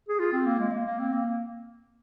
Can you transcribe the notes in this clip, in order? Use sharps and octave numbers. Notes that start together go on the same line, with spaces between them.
G#4
F4
C4
A#3
G#3
A#3
A#3
C4
A#3